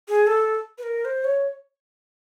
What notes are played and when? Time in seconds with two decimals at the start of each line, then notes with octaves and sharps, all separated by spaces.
0.08 G#4
0.27 A4
0.78 B4
0.83 A#4
1.05 C5
1.24 C#5